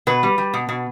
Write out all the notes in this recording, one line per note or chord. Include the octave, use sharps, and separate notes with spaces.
B2 B4
G3
G3
B2
B2